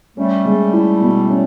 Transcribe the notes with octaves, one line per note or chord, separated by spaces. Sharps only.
G3 A3 C#4
G#3
E4
B2
C#4